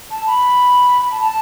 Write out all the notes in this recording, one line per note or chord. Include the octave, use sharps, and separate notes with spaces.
A5
B5
B5
A5
A5